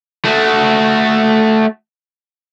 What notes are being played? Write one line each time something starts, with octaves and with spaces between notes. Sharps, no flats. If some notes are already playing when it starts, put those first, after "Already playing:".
A3 F#4